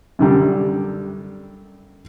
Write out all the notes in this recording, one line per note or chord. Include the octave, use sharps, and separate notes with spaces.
F#2 D3 G3